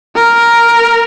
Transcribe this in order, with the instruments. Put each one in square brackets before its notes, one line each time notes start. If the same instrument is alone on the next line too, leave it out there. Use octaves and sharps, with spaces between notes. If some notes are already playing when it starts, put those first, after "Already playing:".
[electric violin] A#4